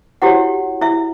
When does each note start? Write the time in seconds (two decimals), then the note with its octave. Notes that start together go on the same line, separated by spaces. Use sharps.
0.22 E4 F#4 G4 C#5 F#5
0.81 E4 E5